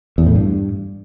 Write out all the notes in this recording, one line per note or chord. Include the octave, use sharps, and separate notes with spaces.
E2
A2
G2